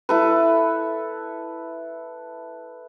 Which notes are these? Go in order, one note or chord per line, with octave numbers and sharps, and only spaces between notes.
E4 A4 B4